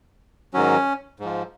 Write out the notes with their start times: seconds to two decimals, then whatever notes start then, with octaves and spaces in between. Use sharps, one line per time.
0.54 G#2 D#3 F#3 C#4
1.20 G#2 F3